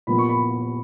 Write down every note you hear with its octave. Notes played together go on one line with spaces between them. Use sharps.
A#2 F3 B3 B5
C#6
B5